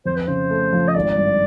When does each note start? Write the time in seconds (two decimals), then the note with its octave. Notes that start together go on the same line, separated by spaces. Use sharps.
0.06 F2 C5
0.16 B4
0.27 C#3 C5
0.50 A3
0.73 F3
0.88 D#5
0.95 G#1 D5
1.18 G2